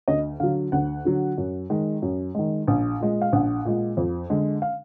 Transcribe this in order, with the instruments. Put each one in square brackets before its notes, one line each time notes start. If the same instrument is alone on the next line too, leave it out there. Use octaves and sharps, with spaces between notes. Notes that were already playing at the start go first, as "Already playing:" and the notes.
[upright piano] D2 D#5
D3 F#3 F5
D2 F#5
D3 F#3
F#2
D#3 G#3
F#2
D#3 G#3
A#1
A#2 G#3
F5
A#1 F#5
A#2 G#3
F2
D3 G#3
F5